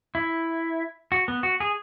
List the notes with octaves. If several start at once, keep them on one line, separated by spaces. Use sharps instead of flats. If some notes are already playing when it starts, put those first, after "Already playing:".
E4
F#4
B3
F#4
G#4